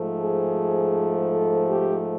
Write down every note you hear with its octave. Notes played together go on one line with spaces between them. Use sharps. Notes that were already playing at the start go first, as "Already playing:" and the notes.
Already playing: G#2 F3 A3
G#4
A4
G4